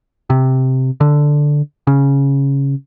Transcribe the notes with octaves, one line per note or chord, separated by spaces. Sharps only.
C3
D3
C#3